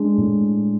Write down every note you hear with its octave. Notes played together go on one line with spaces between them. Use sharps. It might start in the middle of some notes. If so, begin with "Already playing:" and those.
Already playing: G#3 D4
A2